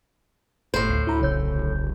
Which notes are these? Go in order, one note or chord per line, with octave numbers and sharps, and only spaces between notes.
G1 A2 C5
D2 C7
D2 E4 A#5 B5
D1 B1 C#3 C#5 G6